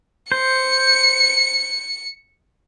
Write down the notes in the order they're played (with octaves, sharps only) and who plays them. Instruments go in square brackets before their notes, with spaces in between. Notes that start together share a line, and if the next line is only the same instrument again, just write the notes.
[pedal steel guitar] C5 [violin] C#7